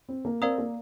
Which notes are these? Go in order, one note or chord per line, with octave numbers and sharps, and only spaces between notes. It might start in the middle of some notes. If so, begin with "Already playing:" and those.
C4
A#3
C4 A#4 D5 F5 A#5 D#6
A#3